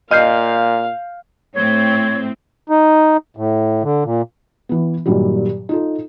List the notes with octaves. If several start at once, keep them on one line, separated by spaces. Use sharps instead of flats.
A#2 D#5 F5 F6 G6 C7
A2 C4 C#5
D#4
A2
D3
A#2
E3 B3
G2 A#2 D#3 F#3 G3
D#4 F4 A4